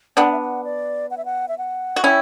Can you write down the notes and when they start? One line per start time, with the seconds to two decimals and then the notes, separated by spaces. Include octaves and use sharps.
0.17 B3 D4 G5
0.25 F#5
0.32 E5
0.40 F#5
0.64 D5
1.11 F#5
1.17 E5
1.25 F#5
1.48 E5
1.58 F#5
1.96 F#4
2.04 C#4 E4 G5